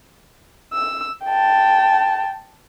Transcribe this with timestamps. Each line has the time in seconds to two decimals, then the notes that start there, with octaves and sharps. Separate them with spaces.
0.74 E6
1.25 G5 A5